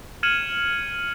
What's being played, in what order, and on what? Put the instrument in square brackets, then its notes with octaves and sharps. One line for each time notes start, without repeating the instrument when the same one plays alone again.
[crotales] F6 G#6 C#7 D#7 E7 F#7